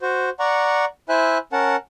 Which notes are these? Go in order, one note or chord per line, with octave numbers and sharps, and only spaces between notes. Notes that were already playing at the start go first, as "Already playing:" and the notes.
F#4 C5
D5 F#5 A#5 C#6
E4 C5 E5 G#5 F#6
C#4 A#4 F#5 A5